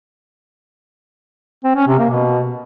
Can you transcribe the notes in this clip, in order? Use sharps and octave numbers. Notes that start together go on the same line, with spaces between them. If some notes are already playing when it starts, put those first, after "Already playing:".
C4
C#4
C3
A#3
B2